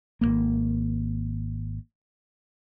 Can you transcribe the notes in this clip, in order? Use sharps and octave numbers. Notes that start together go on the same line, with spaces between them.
G#1 F2 A#3